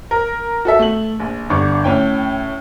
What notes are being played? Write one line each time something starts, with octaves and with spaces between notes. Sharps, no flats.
A#4
F#4 A4 E5
A3 F#7
A#1
G1 D3 C#6 D6
A2 C#4 G5